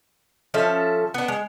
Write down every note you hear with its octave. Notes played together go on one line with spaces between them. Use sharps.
F3 C#4 A4 E5
B3 D4
G#3